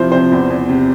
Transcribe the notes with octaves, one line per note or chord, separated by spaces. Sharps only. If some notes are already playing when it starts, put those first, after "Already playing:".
Already playing: C3 F3 E4 C5
C3 C5
E2
E2
C3